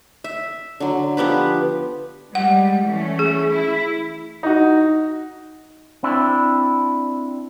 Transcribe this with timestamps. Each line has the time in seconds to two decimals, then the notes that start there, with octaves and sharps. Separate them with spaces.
0.24 E5
0.80 D3 F#3
1.17 F3 B3 G4 B4
2.35 G3 G#3 F#5
2.86 E3 A3 C#4
3.19 G#4
3.50 E4
4.43 D#4 F#4
6.03 C4 D4 E4